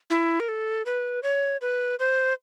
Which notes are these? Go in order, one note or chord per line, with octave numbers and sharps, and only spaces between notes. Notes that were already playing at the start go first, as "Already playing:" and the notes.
E4
A#4
A4
B4
C#5
B4
C5